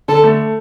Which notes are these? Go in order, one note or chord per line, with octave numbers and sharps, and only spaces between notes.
D3 A4
A3